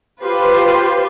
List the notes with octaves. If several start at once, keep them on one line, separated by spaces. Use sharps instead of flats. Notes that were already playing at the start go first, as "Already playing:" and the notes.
F4 G4 B4 C5 C6